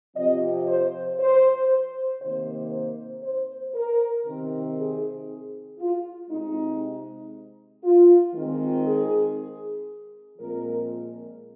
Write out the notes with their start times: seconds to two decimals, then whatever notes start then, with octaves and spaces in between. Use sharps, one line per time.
0.16 C3 F3 C4 D#5
0.67 C5
1.18 C5
2.21 C3 D#3 A#3 C5
2.71 C5
3.23 C5
3.73 A#4
4.24 C3 D#3 C4
4.76 G#4
5.79 F4
6.30 C3 G#3 C4 D#4
7.83 F4
8.34 D#3 G#3 C4
8.85 G#4
10.39 A#2 F3 G#3 C4 A#4